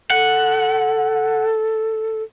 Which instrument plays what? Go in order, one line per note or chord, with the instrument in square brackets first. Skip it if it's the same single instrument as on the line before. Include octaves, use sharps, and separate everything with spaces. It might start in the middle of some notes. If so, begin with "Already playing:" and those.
[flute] A4 [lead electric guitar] F#5